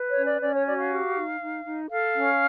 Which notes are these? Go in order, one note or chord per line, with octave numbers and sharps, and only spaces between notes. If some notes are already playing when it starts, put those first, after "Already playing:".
Already playing: B4
C#5
C#4
D5
C#4 D5
C#5
F#4 D5
F5
G4
D#4
D#4
D#4
A4 F5
C#4